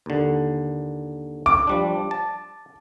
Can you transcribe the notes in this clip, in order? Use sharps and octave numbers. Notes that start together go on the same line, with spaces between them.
D#2 D3
D6
F3 G3 D4
A5